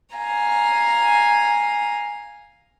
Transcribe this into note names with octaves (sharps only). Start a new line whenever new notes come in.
F5 G#5 A#5